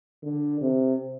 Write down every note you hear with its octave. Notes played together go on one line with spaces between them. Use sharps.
D3
C3